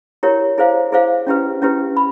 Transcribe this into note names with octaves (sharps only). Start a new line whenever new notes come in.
E4 G4 A#4 C#5
E4 G#4 C5 F5
E4 G#4 C5 F5
C#4 E4 G4 B4
C#4 E4 G4 B4
B5